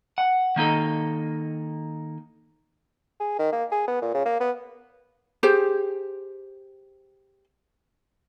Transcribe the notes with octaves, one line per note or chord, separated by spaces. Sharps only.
F#5
D#3 A#3 D#4 A4
G#4
D#3
A#3
G#4
B3
A#2
C#3
A#3
B3
G4 G#4 C5